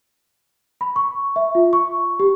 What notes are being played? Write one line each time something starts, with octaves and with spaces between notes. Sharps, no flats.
B5
C#6
E5
F4
C#6
G4